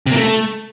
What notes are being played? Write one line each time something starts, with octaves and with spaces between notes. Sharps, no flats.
C3
A#3
A3